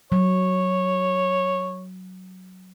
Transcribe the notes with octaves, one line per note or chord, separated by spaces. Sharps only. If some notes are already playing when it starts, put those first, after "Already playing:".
F#3 C#5